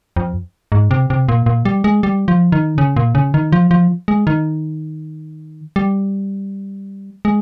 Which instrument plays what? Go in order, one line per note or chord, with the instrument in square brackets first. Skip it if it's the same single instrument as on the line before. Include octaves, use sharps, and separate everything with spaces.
[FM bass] F2
G#2
C3
C3
A#2
A#2
G3
G#3
G3
F3
D#3
C#3
A#2
C#3
D#3
F3
F3
G#3
D#3
G3
G#3